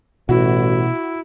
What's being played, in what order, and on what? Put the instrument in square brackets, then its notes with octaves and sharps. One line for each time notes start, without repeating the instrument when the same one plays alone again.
[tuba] A1 [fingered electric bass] B2 [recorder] E4 [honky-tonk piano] F#4